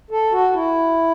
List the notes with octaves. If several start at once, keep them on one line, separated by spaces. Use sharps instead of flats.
A4
F#4
E4